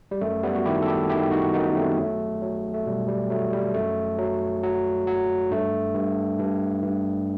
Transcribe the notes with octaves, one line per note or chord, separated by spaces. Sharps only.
G3
F#2 A3
G3 B3
F#4
D#3 E4 G4
A4
E4 G4
D#3 E4 G4
D#4 F#4
F#2 B3 D#4
A3 C4
F#3 A3
F#3
A3
B2 G3
G3
F#3 A3
G3
F#2 A3
F#3
F#3
F#3
G2 A3
G2
G2
G2